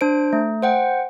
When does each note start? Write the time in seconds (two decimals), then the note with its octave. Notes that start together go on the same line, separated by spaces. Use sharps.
0.01 D4 C5 D7
0.33 A3
0.62 C5 F#5 G5